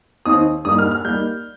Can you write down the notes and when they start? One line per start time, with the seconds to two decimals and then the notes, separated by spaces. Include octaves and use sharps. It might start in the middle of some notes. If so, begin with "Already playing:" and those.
0.26 D#2 D#3 C4 D#4 D#6
0.65 G2 G3 A#3 D#4 D#6
0.78 F6
0.91 F6
1.05 G3 A#3 D#4 G6